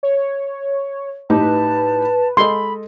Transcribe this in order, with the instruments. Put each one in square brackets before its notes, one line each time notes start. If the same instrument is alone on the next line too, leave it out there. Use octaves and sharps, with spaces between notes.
[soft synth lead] C#5
[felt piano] A2 D#4 G4 [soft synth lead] B4 [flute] A5
[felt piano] G#3 A4 D#5 [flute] B5 [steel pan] C6